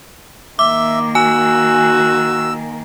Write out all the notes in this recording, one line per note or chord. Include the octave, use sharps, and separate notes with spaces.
D#3 A#3 E5 D6
F#4 G#5 E6